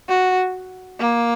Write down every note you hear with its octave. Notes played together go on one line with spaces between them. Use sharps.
F#4
A#3